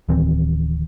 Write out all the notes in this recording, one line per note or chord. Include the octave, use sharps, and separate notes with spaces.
D1 D#3 E3 C4